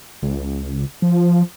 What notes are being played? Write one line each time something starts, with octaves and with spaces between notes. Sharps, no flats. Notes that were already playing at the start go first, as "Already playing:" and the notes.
C#2
F3